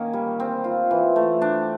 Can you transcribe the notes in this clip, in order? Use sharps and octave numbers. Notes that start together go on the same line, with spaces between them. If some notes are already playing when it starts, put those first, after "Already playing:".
Already playing: D#3 A#3 C#4
G3
C4
F4
E3
A3
D4